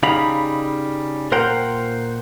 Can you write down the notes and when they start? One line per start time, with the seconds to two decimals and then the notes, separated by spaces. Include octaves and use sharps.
0.03 C#3 G3 D#4 F5 A#5 B5
1.32 A#2 A#4 C5 F#5 G5 A#5